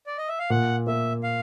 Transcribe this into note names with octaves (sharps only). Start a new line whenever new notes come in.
D5
D#5
E5
F5
A#2 F#5
A#3 E5
F5